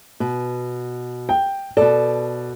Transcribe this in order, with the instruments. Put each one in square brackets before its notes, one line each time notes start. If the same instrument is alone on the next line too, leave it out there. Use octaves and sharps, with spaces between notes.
[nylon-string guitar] B2
[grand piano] G5
[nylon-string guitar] B2 A4 [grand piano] D5